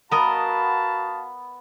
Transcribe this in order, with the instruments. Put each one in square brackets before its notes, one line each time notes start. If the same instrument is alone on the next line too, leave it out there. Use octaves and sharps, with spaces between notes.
[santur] B3 [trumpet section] F#4 F5 B5 [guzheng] A#4 D#5 [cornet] A5